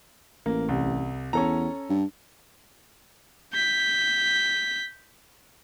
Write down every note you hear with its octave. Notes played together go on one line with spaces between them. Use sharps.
A1 A#3
C2
E2 C#4 A4 A#5
G2
G6 B6